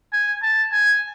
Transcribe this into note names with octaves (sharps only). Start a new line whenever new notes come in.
G#5
A5
G#5